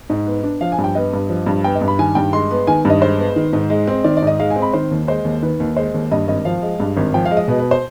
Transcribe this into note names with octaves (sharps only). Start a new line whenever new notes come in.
G#2
B3
D4
F3 F5
G#5
G2
G5
B3 D#5
G2
F3
G2
B3 G5
D#5
G2
B5
D#3 G#5
G2 G5
G#3 C6
B3
D#3 G#5
G2 D#5
G#3 C5
B3
D#3
G#2
G#3
C4
D#3 D5
D5
G#2 D#5
G#3 F5
G#5
C4
B5
D#3 C5
D#2
G#3 C5
D#2
D#3 B4
D#2
G#3 C5
D#2
G2 D#5
G#1 D#5
F3 F5
G#3
G2
G#1
F3 G5
F5
G#3
D#5
B2 B4
B4
C5